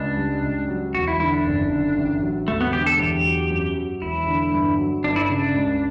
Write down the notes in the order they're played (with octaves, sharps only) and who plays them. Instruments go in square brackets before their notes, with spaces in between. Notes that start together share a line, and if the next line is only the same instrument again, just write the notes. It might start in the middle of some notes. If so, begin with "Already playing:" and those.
Already playing: [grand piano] C#2 [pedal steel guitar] D4
[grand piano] G3
C#2
F#3
[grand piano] E1 [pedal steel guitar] F#4
[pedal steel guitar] E4
[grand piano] D3 [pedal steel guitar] E4
[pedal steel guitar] D4
[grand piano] F#1
D3
A1
F#3
[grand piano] E1 [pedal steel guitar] A3
[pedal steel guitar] B3
[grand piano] D3 [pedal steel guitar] G4
[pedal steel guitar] A4
[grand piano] E2 [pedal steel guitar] G4
[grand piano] F#3
F#2
F#3
[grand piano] E1 [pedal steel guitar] E4
[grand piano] D3
G2
F#3
[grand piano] G1 [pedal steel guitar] D4
[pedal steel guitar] E4
[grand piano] C#3 [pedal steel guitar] D4
[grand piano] C#2